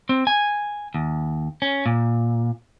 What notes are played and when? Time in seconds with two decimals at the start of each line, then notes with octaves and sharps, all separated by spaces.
0.09 C4
0.27 G#5
0.94 D#2
1.62 C#4
1.86 A#2